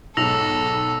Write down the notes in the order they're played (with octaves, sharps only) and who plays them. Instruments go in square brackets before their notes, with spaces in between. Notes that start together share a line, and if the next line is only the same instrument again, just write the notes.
[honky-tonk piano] B1 G#2 [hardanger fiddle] A4 [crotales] E6 A#6 F7